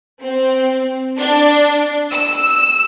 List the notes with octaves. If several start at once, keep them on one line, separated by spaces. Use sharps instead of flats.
C4
D4
E6